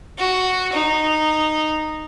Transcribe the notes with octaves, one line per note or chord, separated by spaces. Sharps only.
F#4
D#4